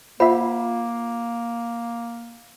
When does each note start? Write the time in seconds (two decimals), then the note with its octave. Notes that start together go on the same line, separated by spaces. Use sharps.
0.20 A#3 F4 C5 E5 F#5 B5